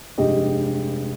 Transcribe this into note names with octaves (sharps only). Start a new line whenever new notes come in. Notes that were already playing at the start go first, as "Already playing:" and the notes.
F1 G2 G#3 G4 D#5